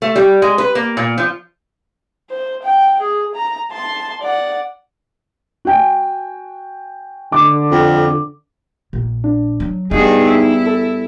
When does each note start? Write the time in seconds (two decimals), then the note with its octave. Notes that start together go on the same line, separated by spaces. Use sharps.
0.02 A3
0.16 G3
0.42 G#3
0.58 B4
0.75 A#3
0.97 A#2
1.18 F3
2.30 C5
2.63 G5
3.00 G#4
3.35 A#5
3.71 A5 C6
4.21 D5 F#5
5.65 F#4 G5 G#5
7.32 D3 D6
7.72 F2
8.93 A#1
9.24 D4
9.60 F#3
9.91 G2 B3 D4 D#4 F#4 G#4
10.26 E4
10.67 A4